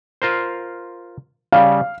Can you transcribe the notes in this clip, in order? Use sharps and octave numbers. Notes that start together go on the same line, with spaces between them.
F4 A#4 C5
C#3 G3 F5